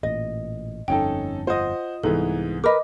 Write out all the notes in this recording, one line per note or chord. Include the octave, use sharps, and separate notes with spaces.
A1 A#2 D#5
G1 F2 C#4 D#4 A4 G5
F4 C5 D#5 F#5 D#6
C2 G#2 E3 B3 A4
A#4 B4 D#5 D6